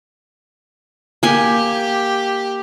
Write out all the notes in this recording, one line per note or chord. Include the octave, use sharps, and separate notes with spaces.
A#3 G4 G#5